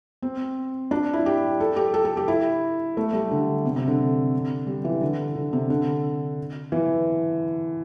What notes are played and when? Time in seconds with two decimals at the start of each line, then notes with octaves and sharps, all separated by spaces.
0.22 C4
0.91 D4
1.13 E4
1.26 G4
1.60 A4
1.76 G4
1.94 A4
2.05 A4
2.17 G4
2.28 E4
2.97 A3
3.13 G3
3.31 D3
3.65 C3
3.76 C3
3.87 D3
4.67 G3
4.85 E3
5.01 D3
5.36 D3
5.53 C3
5.70 D3
6.72 E3